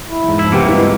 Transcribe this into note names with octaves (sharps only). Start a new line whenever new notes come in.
E4
E2 G#2
F3 E4
F#1 C3 A#3 B3 G4 F#5 B5 E6
G2 E3 F3 G#3 B3 E4